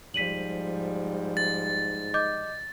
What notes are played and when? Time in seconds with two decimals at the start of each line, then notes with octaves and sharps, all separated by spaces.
0.14 G#2 F3 G3 B6 D#7 F#7
1.37 A6
2.14 D#5 D6 G6